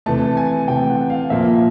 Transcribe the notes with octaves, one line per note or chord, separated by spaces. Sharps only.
C3 E3 A3 A5
G#5
C3 E3 A3 G5
F#5
F5
A#2 F3 A#3 E5